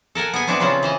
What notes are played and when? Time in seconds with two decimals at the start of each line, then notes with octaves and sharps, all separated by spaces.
0.15 A4 A#4 F#5 G#5
0.33 B3 G#4 G#5
0.47 B3 C4 D4 E4 G#4 B4
0.60 C#3 C4 F4 A4 B4
0.83 E3 C5 D#5